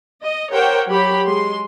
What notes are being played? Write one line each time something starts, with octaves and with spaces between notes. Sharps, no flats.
D#5
G4 A#4 C5 C#5 F#5 G5
F#3 G4 B5
G#3 C6